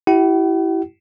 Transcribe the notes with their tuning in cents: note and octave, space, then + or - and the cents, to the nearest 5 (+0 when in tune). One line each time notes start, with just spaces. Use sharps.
E4 +0 G4 -35 F#5 +45